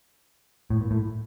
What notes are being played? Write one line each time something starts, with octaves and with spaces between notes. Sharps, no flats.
A2
A#2
A2